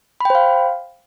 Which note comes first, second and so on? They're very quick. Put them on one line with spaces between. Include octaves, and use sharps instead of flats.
B5 G5 C5 F5